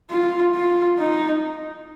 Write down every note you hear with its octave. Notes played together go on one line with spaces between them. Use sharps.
F4
F4
D#4